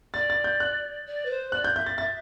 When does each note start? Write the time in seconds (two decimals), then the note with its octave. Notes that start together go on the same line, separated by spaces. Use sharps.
0.13 D5 A6
0.30 A6
0.44 G6
0.60 F#6
1.07 D5
1.25 B4
1.30 C5
1.52 D5 F#6
1.64 G6
1.75 E5 G6
1.86 A6
1.98 E5 A6